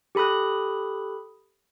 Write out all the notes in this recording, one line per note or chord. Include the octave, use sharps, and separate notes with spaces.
G4 A4 B5 D#6 F#6